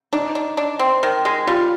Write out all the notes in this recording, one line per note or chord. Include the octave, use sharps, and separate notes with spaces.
D4 D#4
D4
D4
C4
D#3
G#3
G3 F4